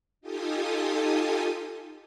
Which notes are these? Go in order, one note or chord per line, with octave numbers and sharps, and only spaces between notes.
D#4 F4 G4 A4 G#5 D#6